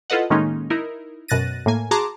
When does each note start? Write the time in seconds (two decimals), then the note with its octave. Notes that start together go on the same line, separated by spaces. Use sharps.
0.10 E4 F4 A4 B4 D#5 F#5
0.30 A2 D#3 G#3 A#3 C#4 D#4
0.70 D#4 E4 A#4
1.28 F#2 B2 F#6 A6 A#6 D#7
1.66 A2 A#3 G#5
1.91 F#4 G#4 A5 A#5 C6 D6